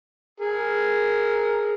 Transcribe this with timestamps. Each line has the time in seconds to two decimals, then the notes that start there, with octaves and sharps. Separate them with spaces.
0.40 G#4 A#4